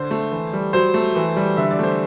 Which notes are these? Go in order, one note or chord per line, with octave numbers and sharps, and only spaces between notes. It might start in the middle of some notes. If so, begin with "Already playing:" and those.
Already playing: D3 C5
A3
E3
G3
F#3 C5
A3
E3
G3
D3 E5
D5
A3 C5